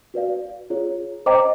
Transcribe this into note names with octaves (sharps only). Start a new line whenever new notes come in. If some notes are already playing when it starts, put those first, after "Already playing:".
F#4 B4 D5 F5
F4 G#4 C#5
C5 D#5 G5 A#5 D6